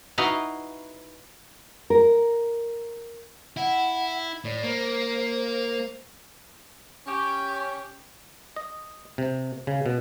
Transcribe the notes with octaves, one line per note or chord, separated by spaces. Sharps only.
D#4 E4 F#4 B4 F5
A#4
E4 F#5
A2 D5
A#3 C5
C#4 G4 C#6
D#5
C3
C#3
B2